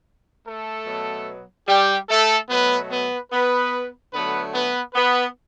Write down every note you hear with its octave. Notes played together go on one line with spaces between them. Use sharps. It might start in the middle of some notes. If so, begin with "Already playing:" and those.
A3 A4
B2 F#3 B3
G3 G4
A3 A4
B2 F#3 A3 B3 B4
B3 B4
B3 B4
D3 F#3 A3 B3 B4
B3 B4
B3 B4